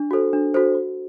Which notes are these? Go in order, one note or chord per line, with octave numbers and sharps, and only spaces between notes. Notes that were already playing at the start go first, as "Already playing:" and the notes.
Already playing: D4
F#4 A4 C5
D4
F#4 A4 C5
F#4